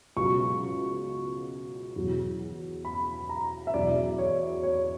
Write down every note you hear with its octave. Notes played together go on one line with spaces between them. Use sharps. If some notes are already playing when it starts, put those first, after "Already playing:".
C#2 B2 F#3 C#6
E2 B2 F#3
B5
A#5
E5
E2 B2 F#3 D5
C#5
C#5